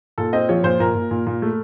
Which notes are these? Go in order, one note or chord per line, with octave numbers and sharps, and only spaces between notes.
A#2 A4
C4 D#5
F3 C#5
A#2 C5
A#2 A#4
A#2
A#2
A#2
A3